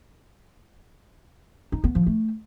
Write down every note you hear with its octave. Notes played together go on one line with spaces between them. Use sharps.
D#4
B3
F3
A3